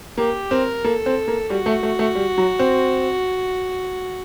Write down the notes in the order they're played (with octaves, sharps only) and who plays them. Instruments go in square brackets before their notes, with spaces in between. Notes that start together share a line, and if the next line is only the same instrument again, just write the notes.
[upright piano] A#3 [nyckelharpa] G4
[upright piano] C4 [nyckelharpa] A#4
[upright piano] A#3 [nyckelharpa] A4
[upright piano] C4
A#3
[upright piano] G3 [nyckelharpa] F#4
[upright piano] A3
A3
A3
G3
F#3
C4